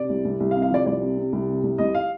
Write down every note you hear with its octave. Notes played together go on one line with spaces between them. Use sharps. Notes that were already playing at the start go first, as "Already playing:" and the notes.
Already playing: C3 D5
C2
C2
C2
F5
C3
F5
F3 D5
C2 D5
C3
C3
C2
C3
C2
C2 D#5
F5